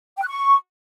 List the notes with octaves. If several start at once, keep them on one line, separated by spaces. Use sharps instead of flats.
G5
F#6
C#6